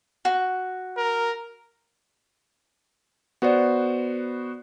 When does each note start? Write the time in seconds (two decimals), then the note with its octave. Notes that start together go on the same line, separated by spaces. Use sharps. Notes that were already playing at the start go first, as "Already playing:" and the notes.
0.25 F#4
0.97 A#4
3.42 B3 F#4 C5 D5 F#5